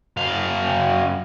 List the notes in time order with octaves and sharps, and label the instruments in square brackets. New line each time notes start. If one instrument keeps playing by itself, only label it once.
[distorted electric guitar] F#2 F5